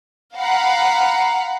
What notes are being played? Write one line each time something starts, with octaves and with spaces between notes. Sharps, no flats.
F5 F#5 A#5 B5